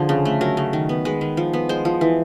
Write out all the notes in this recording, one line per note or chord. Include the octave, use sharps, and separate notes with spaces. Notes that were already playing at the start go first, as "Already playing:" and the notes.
Already playing: D3 F3 G#4
C#3
A3
F#3 A#4
C#3
D#3
B3
G#3 B4
D#3
F3
B3
G#3 C5
F3
E3